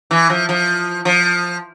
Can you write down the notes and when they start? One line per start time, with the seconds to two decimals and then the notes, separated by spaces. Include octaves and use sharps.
0.11 E3
0.30 F3
0.49 F3
1.05 F3